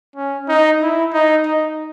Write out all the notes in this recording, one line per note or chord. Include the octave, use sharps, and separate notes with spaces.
C#4
D#4
E4
D#4
D#4